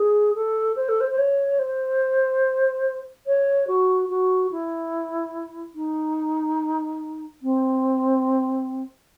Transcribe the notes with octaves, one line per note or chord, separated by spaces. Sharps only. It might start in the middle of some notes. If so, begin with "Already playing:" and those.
Already playing: G#4
A4
C5
A4
C5
C5
C#5
C5
C#5
F#4
F#4
E4
D#4
C4